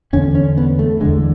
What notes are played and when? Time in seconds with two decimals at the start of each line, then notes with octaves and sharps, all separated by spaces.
0.13 E2 D3 C#4
0.35 C#4
0.58 B3
0.79 A3
1.00 D3 G#3
1.05 E2